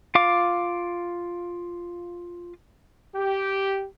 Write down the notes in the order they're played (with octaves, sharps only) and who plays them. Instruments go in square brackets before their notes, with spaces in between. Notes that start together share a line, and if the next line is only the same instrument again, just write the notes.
[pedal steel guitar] F4 F5 D6
[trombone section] G4